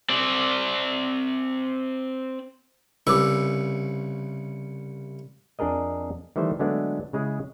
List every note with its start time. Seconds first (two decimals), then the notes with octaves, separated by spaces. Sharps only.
0.09 C4 D5
3.07 C2 C#3 B4 D6 E6
5.59 F2 D4 G#4 A#4 D#5
6.36 D#3 E3 G3 A3 C5
6.59 D3 F#3 G#3 A3 B3 D4
7.13 C#3 G#3 E4 G#4